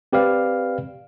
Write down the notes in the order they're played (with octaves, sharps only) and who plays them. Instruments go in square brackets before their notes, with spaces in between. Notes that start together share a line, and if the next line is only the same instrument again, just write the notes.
[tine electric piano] C4 G4 B4 D5 F5